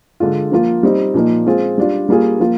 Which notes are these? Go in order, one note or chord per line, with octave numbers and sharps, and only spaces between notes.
D3 G#3 D4 F4
F3 A#3 F4
G3 C4 D#4
A#2 F3 A#3 D#4
G#3 C4 F4 G#4
G3 D4 F4
G3 A#3 F4 G#4
F3 A#3 F4